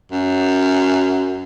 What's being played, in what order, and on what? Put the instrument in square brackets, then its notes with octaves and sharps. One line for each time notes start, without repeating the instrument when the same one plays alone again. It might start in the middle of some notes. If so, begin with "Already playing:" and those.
[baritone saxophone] F#2